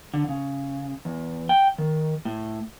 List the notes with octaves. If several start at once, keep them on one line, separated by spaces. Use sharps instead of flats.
D3
C#3
E2
G5
D#3
A2